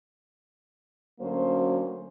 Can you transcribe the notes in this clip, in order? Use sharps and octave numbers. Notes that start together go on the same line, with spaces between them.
D2 F#3 A#3 C#4 C5